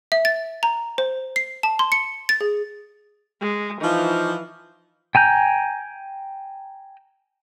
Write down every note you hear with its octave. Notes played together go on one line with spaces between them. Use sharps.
E5
A6
A#5
C5
C7
A5
C6
C#7
A6
G#4
G#3
E3 F3 D#4
G5 G#5 A#5 G6